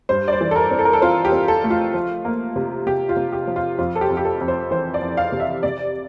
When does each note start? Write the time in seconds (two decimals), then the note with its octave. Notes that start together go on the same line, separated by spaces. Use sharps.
0.09 G2 C5
0.28 D5
0.33 C5
0.41 E3
0.51 A4
0.56 A#4
0.71 C4
0.79 A4
0.85 A#4
0.93 A4
1.02 C4 F4
1.25 G4
1.32 C4
1.48 A4
1.64 A3
1.70 F4
1.94 F3
2.25 A#3
2.56 C3
2.86 C3 G4
3.09 F4
3.17 C3
3.32 G4
3.47 F3
3.56 F4
3.78 F2 F4
3.96 A4
4.01 G4
4.09 F2
4.17 G4
4.25 A4
4.41 F2
4.48 C5
4.71 E3 C5
4.94 D5
5.02 F2
5.17 F5
5.32 C3
5.40 E5
5.63 C3 D5